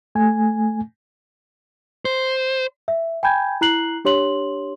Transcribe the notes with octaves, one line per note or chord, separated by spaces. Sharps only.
A3 G#5
C5
E5
G5 G#5 B5 G6 G#6
E4 A#5 F#6 C7 F#7
D4 G4 C#5 C6 F#7